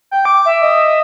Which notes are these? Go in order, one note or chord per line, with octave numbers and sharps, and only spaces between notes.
G5
D6
E5
D#5